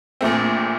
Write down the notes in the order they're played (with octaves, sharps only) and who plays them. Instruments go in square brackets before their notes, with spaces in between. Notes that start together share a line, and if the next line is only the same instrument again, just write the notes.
[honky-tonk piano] A#1 A#2 A3 C4